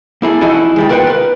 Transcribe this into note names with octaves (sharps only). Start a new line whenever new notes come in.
A#3 E4 G#4 A4
E3 F3 D#4 E4 F#4 G#4
D#3 G3 G#3
F4 A#4 B4 C#5 F#5 G5
A#4 B4